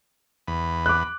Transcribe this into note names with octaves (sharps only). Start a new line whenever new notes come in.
E2 B5
D6 F#6